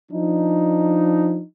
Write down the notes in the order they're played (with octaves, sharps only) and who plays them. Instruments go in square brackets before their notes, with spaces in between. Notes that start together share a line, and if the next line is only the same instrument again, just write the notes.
[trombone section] F3 D4 D#4